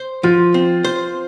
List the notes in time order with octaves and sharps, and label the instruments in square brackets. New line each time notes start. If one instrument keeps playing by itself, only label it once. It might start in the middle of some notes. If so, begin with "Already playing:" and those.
Already playing: [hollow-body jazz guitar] C5
[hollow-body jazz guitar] F3 [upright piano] F4
[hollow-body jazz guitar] C4
C5